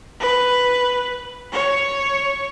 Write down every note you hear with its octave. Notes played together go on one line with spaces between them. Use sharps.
B4
C#5